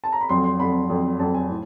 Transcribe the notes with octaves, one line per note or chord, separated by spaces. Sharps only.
A5
A#5
B5
F2 D3 F#3 C6
C6
F2 D3 F#3 B5
F2 D3 F#3
F2 D3 F#3 A5
G#5
A2